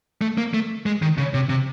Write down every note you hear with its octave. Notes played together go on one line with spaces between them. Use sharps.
A3
A#3
A3
G#3
D#3
C#3
C3
C3